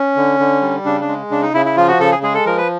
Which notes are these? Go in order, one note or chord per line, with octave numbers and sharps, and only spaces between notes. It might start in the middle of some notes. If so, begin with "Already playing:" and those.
Already playing: C#4
D3
D3
G3
C#3 D4
D4
G#3
C#3 D4
D#4
C#3 E4
E4
F3 F4
F#4
C#3 A4
G#4
G#3 G#4
A4
F3 A#4
B4